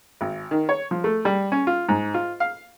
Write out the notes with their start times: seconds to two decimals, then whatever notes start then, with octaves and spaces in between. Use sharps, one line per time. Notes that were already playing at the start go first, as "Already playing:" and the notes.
0.21 G#1
0.51 D#3
0.69 C#5
0.91 F3
1.04 A3
1.25 G3
1.52 C#4
1.67 F4
1.89 G#2
2.14 F4
2.40 F5